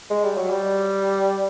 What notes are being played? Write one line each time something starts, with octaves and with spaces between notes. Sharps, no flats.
G#3
G3
F#3
G3